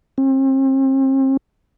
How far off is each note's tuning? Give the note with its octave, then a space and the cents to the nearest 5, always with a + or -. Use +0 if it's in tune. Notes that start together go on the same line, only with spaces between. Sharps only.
C4 +40